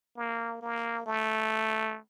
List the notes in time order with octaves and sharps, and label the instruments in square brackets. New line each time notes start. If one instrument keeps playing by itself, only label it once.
[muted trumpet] A#3
A#3
A3